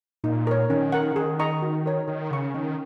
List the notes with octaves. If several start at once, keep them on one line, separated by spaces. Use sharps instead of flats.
A#2 D#4
A#4 C#5
D#3 C#4
A#4 F#5
C#3
D#3 G#4
D#5 A#5 C#6
F#4
A#4 C#5 A#5
D#3 A#4
C#3 F#5 C#6
D#3 C#4